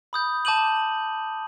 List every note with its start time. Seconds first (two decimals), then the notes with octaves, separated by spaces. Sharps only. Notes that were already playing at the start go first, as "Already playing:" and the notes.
0.13 B5 D#6 G6
0.45 A5 D6 G6 D#7 F#7